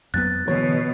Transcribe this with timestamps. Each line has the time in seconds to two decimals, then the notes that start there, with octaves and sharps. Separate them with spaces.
0.14 F2 F#3 B3 F#6 A6
0.48 B2 D3 E3 F#3 C#5